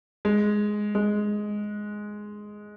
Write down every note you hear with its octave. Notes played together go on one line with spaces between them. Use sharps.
G#3
G#3